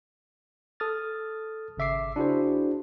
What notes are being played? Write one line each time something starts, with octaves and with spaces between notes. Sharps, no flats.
A4 D#6 F6 A6
G#1 C#3 E5 D6 C7
D4 E4 F#4 G#4 C5